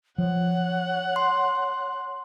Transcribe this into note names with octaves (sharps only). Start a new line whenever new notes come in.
F3 C#5 F#5
C6